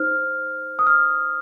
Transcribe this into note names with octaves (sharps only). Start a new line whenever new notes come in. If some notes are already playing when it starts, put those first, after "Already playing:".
Already playing: D#4 C5 F6
D#6
F6